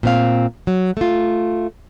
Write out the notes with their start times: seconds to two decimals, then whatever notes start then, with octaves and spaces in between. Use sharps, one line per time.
0.03 A#2 C4 F5
0.67 F#3
0.97 A3 F4